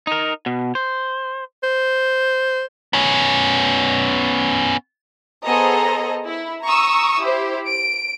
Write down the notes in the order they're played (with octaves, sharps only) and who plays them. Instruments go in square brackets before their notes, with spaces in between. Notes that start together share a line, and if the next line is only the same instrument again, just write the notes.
[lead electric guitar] D#4 A#4
B2
C5
[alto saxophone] C5
[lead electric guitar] B3 C#4
[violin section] B3 G#4 A4 C5 D#5 A#5
E4
A#5 C#6 D#6 E6
E4 G4 C5
D7